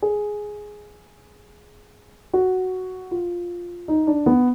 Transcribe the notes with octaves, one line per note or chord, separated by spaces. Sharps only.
G#4
F#4
F4
D#4
D4
B3